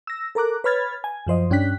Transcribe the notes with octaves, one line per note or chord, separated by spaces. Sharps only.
E6 A#6
A4 A#4 A#5 D6 F#6
B4 C#5 B5 F6 G#6 A6
G#5
F#2 F3 C5 D#5
G2 C#4 D4 G5 F#6 B6